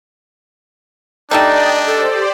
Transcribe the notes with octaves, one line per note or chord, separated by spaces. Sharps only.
G3 A3 D4 D#4 D5 G5 D#6
G4 A4 C5 D5